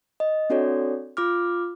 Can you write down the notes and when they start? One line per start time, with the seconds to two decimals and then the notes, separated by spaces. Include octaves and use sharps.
0.20 D#5
0.50 C4 D4 F#4 A4 C#5 D5
1.17 F4 D6 F6